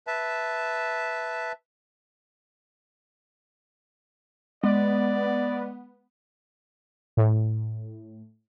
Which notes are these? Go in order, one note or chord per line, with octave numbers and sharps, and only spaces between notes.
B4 E5 A5
G#3 B3 D5
A2